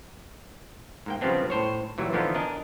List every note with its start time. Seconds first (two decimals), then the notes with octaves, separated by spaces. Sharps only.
1.06 G#2 A#3 G5
1.21 C#3 F3 G3 B3 C4 D4
1.50 A2 C5 C#5
1.98 A#2 E3 F#3 G3
2.13 D3 E3 F3 B3 D4 D#4
2.34 D4 A#4 D#5 G#5